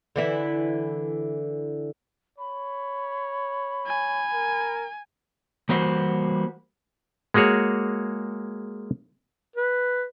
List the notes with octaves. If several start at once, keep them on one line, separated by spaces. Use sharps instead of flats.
D3 E3 E4
C#5 B5
G#5
A#4
E3 G3 A#3 F#4 C5
G#3 A#3 F#4 G#4 C#5
B4